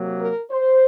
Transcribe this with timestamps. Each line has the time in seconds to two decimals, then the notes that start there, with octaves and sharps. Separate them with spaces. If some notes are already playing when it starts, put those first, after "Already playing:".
Already playing: C3 F#3 A#3
0.20 A#4
0.50 C5